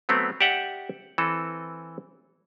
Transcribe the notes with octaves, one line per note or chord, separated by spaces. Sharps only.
F#3 A3 B3 C4
G4 D5 E5 F#5 G5
E3 C4 A4 B4